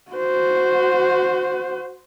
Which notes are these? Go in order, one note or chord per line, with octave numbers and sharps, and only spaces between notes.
F#4 C5